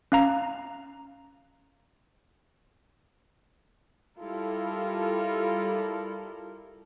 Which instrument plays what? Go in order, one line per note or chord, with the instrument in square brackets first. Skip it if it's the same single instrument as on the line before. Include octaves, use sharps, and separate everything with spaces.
[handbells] C#4 F5 A#5
[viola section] G3 E4 F4 A4 A#4